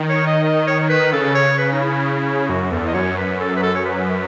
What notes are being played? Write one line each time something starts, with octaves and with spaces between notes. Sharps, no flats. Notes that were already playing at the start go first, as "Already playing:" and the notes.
Already playing: D#3
C#5
D#5
D#5
C#5
C#5
B4
C#3 A4
C#5
B4
D#4
E4
F#2 F#4
E2 A4
D#5
F#2 C#5
B4
A4
B4
A4
C#5
B4